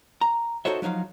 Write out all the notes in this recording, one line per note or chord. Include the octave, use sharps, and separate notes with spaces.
A#5
D#4 F#4 A4 C5 C#5 E5
F3 F#3 D#4 E5 F5